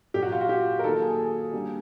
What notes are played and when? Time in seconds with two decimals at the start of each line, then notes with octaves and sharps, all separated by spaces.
0.14 A#2 F#3 A#3 G4
0.23 F#4
0.32 F4
0.41 F#4
0.49 G4
0.79 A#4
0.84 D#3 F#3 A#3 A4
1.02 G#4
1.18 G#4
1.53 D3 G3 A#3